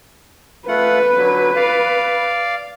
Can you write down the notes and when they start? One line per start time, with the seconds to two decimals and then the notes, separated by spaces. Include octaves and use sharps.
0.68 A3 F4 B4 F#5
1.17 D3 F#3
1.56 D5 F5